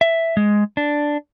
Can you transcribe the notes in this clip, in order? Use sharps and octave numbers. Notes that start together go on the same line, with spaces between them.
E5
G#3
D4